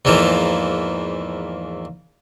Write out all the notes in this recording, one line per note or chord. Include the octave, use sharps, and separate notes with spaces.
E2 G#2 E3 F3 A#3